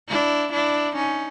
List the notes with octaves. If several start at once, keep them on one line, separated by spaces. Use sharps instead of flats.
D4 E4
D4 E4
C#4 D#4